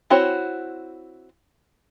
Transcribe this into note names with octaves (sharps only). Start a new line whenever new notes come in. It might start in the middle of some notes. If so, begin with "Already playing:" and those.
C4 E4 F#4 C5 C#5